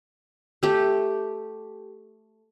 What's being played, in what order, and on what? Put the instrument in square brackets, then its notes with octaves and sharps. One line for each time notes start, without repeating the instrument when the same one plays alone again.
[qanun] A3 G4